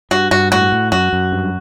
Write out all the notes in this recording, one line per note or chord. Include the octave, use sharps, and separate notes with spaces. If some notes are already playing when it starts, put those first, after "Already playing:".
G2 F#4
G2 F#4
A2 F#4
A2
F#2 F#4
F#2
G2